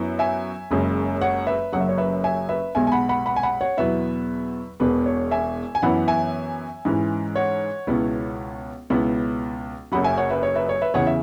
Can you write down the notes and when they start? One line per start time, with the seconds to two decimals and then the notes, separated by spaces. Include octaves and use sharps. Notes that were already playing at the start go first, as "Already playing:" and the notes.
Already playing: F#2 F#3 B3 E4
0.19 E5 G#5
0.71 F#1 F#2 C#3 G#3 C#4
1.21 C#5 F#5
1.46 B4 E5
1.72 F#1 F#2 F#3 F#5
1.81 E5
1.89 C#5
1.98 B4 E5
2.24 E5 G#5
2.49 B4 E5
2.75 B1 B2 G#3 E5 G#5
2.87 G#5
2.92 F#5 B5
3.09 F#5 B5
3.26 F#5 B5
3.36 G#5
3.43 F#5 B5
3.61 C#5 F#5
3.77 E2 B2 F#3 B3 E4 B4 E5
4.80 E1 E2 B2 B4
5.06 C#5
5.31 E5 G#5
5.75 G#5
5.82 F#2 E3 B3 E4 F#5 B5
6.07 E5 G#5
6.85 G#2 E3 C#4 E4
7.36 C#5 F#5
7.87 C#2 B2 B3 E4
8.90 C#2 B2 B3 E4
9.92 F#1 F#2 F#3 F#5 B5
10.04 E5 G#5
10.17 C#5 F#5
10.30 B4 E5
10.43 C#5
10.56 B4 E5
10.69 C#5
10.82 B4 E5
10.94 E2 C#3 E3 C#4 C#5 F#5
11.07 E5